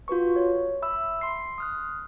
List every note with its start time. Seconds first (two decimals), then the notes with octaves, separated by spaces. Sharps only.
0.08 F4 F#4 B4 C#6
0.36 C#5
0.82 E5 B5 E6
1.21 C6 C7
1.58 D#6 F6 F#6